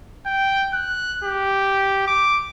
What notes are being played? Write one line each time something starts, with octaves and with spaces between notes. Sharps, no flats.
G5
F#6
G4
D6